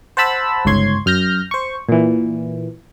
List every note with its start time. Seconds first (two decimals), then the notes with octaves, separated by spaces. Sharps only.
0.17 C5 F#5 A5 B5 E6
0.65 G1 C#2 G#2 C#5 C6 G#6
1.06 F#2 F6 G6 A#6
1.51 C5 C#6
1.89 A#2 E3